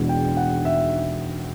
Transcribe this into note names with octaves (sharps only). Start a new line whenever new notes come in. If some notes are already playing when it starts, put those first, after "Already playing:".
Already playing: E2 B2 G#3 B3 D4
G5
F#5
E5